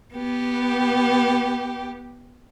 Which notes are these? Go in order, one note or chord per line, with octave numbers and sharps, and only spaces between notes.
B3 G4